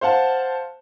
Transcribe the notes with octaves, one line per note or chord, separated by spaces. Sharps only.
C5 F5 F#5 A5